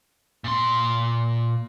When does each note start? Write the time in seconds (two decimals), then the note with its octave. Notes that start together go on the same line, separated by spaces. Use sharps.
0.44 A#2 C6